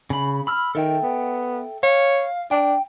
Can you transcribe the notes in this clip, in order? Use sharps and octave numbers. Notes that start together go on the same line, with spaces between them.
C#3 B5
B5 E6 F6
D#3 A4 E5 G5
B3
C#5 F5
D4 G5